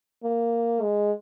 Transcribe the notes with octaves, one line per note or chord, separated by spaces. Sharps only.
A#3
G#3